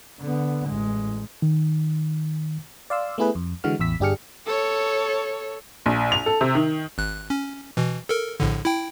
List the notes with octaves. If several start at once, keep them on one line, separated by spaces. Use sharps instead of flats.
D3 B3
A1 G#3
D#3
D5 F5 C6 E6
A3 B3 E4 G#4 B4
F2
D3 E3 G#3 F#4 F6
A1 E2 E6 B6
G1 D4 G4 G#4 F6 C#7
A4 C#5
A#1
F7
A4
C3
D#3
G#1 F#6
C#4
B2 E3
A4 A#4
A#1 A2 D3
E4 G5